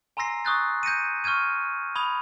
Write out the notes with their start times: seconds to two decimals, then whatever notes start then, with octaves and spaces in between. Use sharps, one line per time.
0.17 G#5 A#5 C6 E6 A#6 C7
0.45 C#6 D#6 E6 F#6 G6 A6
0.83 G6 A#6 C#7 D#7
1.24 C#6 F6 G6 G#6 D#7
1.95 B5 D#6 G#6 F7 G7